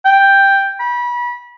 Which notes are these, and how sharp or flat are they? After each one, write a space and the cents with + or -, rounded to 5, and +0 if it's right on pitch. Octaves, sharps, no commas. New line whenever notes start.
G5 +5
B5 -30